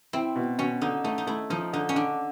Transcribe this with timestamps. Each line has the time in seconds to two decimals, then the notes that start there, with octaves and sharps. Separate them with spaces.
0.13 C4 E4
0.36 B2
0.59 B2 C#4
0.82 D3 D#4
1.04 A3 D#4
1.18 D#4
1.27 A3 E4
1.50 F3 D#4
1.73 D3 D#4
1.89 C#4
1.95 D3 D4